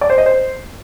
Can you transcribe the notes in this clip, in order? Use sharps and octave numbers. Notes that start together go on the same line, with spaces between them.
D5
C5
D#5
C5